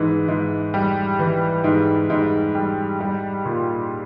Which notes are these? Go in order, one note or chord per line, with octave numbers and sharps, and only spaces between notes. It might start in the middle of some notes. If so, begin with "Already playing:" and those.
Already playing: G#2 E3
G#2
G3
E3
G#2
G#2
G3
G3
A#2